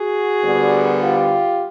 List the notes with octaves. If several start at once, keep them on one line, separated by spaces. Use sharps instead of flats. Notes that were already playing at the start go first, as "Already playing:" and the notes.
Already playing: F#4 G#4
D2 D3 G3 B3
F4 G4